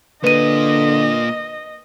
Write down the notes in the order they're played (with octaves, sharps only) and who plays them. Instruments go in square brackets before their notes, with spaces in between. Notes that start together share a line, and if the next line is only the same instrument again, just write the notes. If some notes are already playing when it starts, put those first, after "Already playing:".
[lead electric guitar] A#2 A#3 [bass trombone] D3 [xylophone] B4 D#7 [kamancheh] D#5